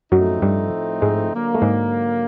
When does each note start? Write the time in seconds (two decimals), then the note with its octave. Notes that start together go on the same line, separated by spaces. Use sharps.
0.12 F#2 A2 F3 F#3 A3 C4 D#4
0.42 G2 G3
1.02 G#2 G#3
1.33 D3 F#3 A#3
1.54 A3
1.62 G#2 G#3